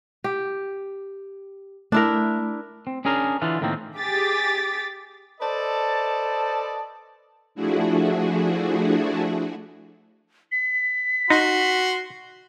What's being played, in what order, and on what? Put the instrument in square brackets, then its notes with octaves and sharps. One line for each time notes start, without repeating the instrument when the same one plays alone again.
[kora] G4
[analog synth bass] A3 [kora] D4 E4 A#4
[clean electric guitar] C4
C#4 D4 G#4 A#4
D3 E3 D4 F4
A2 D#3 F3 A#3 C4
[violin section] G4 G#4 D6 A6 B6
[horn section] A4 B4 C5 D5 D#5 A5
[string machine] F3 A3 D4 E4 F#4 G#4
[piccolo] B6
[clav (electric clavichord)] D#4 [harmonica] F#4 C6